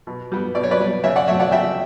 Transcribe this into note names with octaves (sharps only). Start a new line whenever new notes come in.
B2
G3 B3
B2 D5
C#5
B4 D5
G3 B3
C#3 C#5 E5
D5 F#5
F#3 A3 C#5 E5
D5 F#5
C#3 E5 G5